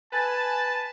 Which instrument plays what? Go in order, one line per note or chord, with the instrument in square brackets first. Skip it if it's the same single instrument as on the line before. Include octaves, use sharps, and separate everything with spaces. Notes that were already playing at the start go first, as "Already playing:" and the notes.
[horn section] B4 A5 [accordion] G#5